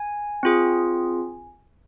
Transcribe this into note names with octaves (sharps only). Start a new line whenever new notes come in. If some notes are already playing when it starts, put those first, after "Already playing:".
Already playing: G#5
C4 F4 G#4